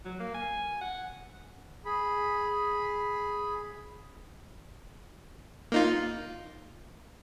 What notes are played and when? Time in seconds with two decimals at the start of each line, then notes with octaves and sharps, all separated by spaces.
0.05 F#3
0.20 A#3
0.34 G#5
0.81 F#5
1.85 G#4 B5
5.72 A#3 D#4 F4